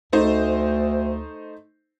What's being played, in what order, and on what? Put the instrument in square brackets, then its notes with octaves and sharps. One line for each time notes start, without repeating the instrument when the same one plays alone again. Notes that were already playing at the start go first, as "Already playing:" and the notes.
[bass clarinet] D2 [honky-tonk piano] A3 D#4 C5